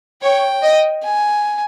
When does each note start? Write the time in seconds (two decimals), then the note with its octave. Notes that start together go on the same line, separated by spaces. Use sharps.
0.22 C#5 G5
0.63 D#5
1.04 G#5